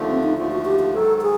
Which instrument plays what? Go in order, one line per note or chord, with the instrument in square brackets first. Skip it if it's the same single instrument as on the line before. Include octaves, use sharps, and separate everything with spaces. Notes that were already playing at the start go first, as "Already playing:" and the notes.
Already playing: [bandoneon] D#2 D3 F3 A3
[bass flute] C4
D#4
[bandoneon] D#2 D3 F3 A3 [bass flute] F4
[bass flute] F#4
G4
G4
[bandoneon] G#2 D#3 F#3 [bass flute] A4
[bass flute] G#4